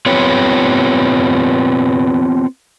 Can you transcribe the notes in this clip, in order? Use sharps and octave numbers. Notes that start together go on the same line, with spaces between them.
B3 C4 F4 G4 B4 C#5